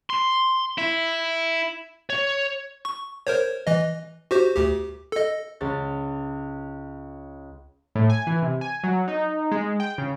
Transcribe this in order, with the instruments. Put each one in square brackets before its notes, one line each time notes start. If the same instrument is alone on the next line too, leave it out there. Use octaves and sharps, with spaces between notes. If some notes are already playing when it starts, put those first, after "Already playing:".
[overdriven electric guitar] C6
E4
C#5
[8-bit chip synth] C#6
A#4 C5 C#5
E3 D#5
F#4 G4 C5
D2 G4
A4 D#5
[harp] C#2 A6
[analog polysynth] A2
G#5
E3
C3
G#5
F#3
D#4
G#3
G5
C#3